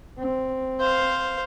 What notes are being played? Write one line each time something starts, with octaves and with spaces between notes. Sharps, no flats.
C4
C5 F5